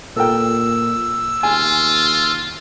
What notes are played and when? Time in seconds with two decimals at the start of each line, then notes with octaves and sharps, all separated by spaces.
0.17 A#2 A4 A#4 G5 E6
1.43 D#2 F4 G#5